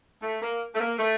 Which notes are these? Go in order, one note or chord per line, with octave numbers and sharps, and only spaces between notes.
A3
A#3
A3
A#3
A3